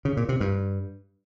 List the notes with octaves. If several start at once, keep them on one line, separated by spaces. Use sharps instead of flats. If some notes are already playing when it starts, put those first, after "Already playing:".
C#3
A#2
C3
G2